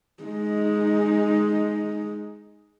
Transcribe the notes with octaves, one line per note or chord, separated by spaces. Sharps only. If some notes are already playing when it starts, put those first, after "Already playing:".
G#3 D#4